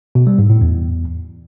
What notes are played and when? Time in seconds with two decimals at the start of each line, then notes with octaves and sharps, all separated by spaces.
0.15 B2
0.27 G3
0.38 G#2
0.50 A2
0.61 E2